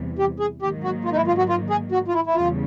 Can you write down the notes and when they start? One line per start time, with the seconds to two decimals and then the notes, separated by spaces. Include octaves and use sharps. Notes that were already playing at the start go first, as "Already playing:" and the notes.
Already playing: E2 C3 E3 G3
0.19 G4
0.40 G#4
0.62 G#2 D#3 F#3 A#3 G4
0.84 F#4
1.05 F4
1.12 D#4
1.16 E4
1.27 F4
1.38 F#4
1.49 F4
1.70 G#4
1.92 F#4
2.08 F4
2.14 E4
2.27 E4
2.35 E2 C#3 E3 G3 F4